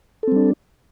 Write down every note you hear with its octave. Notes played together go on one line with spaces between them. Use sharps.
G3 C4 D4 A4